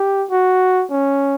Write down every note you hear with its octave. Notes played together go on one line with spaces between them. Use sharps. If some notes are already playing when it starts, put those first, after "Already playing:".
Already playing: G4
F#4
C#4